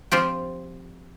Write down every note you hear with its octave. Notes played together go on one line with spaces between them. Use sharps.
F3 C4 F4 G4